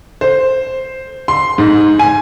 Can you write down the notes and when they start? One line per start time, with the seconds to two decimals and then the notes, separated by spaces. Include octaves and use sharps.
0.21 C5
1.28 C6
1.58 G#2
1.99 G#5